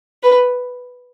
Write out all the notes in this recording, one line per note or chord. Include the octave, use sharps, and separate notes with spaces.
B4